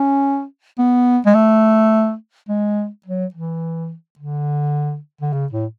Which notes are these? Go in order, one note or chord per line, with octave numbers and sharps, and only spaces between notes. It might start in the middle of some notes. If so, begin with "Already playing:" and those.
Already playing: C#4
B3
G#3
A3
G#3
F#3
E3
D3
D3
C#3
A2